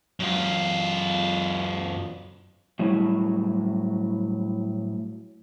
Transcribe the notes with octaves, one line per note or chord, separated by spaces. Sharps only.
F#2 F4
A2 F#3 G3 E4